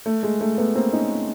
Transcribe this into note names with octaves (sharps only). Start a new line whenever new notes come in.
A3
G#3
A3
A3 B3
A#3 C4
C#4 D#4